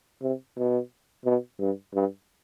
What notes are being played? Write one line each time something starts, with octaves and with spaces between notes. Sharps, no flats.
C3
B2
B2
G2
G2